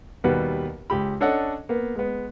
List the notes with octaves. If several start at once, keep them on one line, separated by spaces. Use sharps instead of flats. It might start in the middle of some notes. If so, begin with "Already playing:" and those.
D#2 B2 G3 B4 F#5
C#2 G4 B5
C#4 D4 A4 C#5 D#5 F#5
A#3 B3
G#3 B3